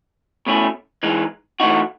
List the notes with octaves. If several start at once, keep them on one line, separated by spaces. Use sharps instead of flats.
B2 A3 C#4 E4
E3 G#3 D#4
E3 A3 D#4 F#4